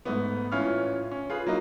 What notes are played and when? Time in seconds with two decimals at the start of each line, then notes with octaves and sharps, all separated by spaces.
0.05 G#2 A3 B3
0.52 A1 E3 C#4 F4 F6
1.11 C#4
1.30 F4 G#4 B4
1.46 F#3 A#3 D#4